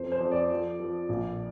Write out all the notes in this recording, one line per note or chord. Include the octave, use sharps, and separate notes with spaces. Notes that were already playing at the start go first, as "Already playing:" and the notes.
Already playing: F2 C5
C5
F2
D5
F3
F3
A#1